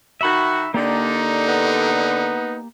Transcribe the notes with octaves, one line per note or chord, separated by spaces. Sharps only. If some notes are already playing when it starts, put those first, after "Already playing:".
D#3 F#4 E5 B5
D3 A#3 D#4 G4 D5
B3